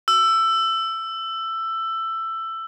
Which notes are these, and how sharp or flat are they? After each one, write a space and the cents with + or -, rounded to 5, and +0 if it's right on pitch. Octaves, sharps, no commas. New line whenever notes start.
E6 +15